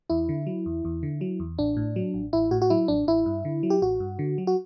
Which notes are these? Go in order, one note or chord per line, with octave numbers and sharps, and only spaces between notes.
E2 E4
D3
F#3
E2
E2
D3
F#3
E2
A1 D4
A2
F#3
A1
A1 E4
A2 F#4
F#4
F#3 E4
A1 D4
A1 E4
G2
D3
F#3
G4
A1 F#4
G2
D3
F#3
F#4